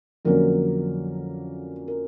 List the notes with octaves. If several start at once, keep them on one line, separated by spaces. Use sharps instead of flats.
F2 D3 F#3 A#3 C#4 A#4
A#4